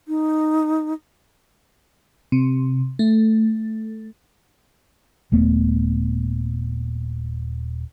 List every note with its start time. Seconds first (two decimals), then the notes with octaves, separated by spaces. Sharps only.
0.08 D#4
2.32 C3
2.99 A3
5.32 D#1 D#2 A3 B3